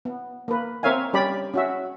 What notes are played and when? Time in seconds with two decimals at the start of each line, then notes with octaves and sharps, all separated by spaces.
0.05 B3
0.48 A#3 B4
0.83 C4 A#4 C#5 E5 F5 G#5
1.13 G3 C#4 G4 D5 B5
1.54 C#4 F#4 E5